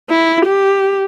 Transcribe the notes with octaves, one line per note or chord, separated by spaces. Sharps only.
E4
G4